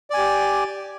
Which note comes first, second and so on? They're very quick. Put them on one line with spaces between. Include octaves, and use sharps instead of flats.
D5 G#5 G4